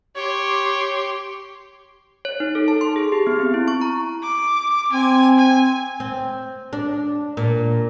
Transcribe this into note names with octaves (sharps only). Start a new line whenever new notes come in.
G4 C#5 C6
C#5
D#4
A4
A5
C6
G#4
G4
B3
C4
E4
C#6
A#5
D6
C4 G#5
G#5
C4
D4
A#2